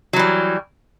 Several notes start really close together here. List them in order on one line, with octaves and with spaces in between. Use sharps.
F#3 E3 G3